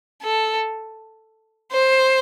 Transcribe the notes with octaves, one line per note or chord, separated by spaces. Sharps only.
A4
C5